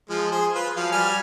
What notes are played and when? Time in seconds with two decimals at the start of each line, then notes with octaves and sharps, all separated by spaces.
0.10 F3 G#3
0.32 G#4 C5
0.55 F4 B4
0.77 F3 F#3 F5
0.92 G3 G#5 F6